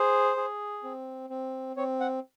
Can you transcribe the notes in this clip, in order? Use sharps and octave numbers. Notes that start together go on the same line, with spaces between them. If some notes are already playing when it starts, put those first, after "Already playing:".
Already playing: G#4 C5
G#4
C4
C4
C4 C#5
F#5